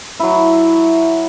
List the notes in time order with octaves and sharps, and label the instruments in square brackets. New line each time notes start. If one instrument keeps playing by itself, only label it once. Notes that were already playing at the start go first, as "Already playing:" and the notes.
[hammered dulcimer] F#3 E4